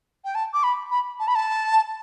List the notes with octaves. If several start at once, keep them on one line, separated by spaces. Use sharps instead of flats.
G5
A5
D6
B5
B5
A5
B5
A5